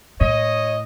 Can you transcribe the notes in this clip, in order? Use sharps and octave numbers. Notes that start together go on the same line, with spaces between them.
A2 C#5 D#5